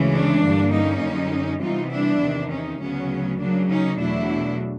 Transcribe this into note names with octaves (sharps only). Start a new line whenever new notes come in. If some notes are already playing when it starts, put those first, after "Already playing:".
Already playing: D2 C#3 E3 G#3 C#4
D4
G2 D3 G3 A#3
C#4 D#4
F#2 D3 G3
C3 E3 G3 B3 D#4 F4
D4 E4
E2 C3 D#3
C#4 D#4
D2 C#3 F#3 B3 C#4
C#3 F#3 A#3 D4
C#4 D#4
E2 B2 F#3 A3 D4 E4